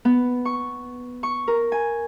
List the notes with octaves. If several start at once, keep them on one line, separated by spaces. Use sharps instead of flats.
B3
C#6
C#6
A#4
G#5